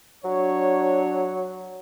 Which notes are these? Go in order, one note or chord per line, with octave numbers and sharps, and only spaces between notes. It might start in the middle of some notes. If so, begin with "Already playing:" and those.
F#3 D4 C#5